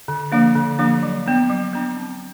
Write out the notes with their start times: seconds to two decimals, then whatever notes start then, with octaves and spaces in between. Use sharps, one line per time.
0.08 D3
0.32 F3 A#3 D4
0.55 D3
0.79 F3 A#3 D4
1.03 F#3
1.26 B3 D4
1.50 F#3
1.73 B3 D4
1.97 C4